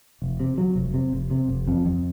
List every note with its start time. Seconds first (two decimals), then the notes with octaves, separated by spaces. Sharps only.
0.22 F1
0.40 C3
0.58 F#3
0.75 F1
0.94 C3
1.12 F1
1.30 C3
1.48 F1
1.67 F2
1.86 F2